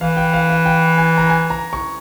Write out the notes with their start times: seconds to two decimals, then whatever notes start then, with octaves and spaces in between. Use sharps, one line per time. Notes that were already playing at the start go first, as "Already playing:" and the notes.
0.01 E3 F5
0.17 G5
0.34 F5
0.50 F5
0.66 G5
0.98 G#5
1.18 A#5
1.30 G#5
1.50 A#5
1.73 C#6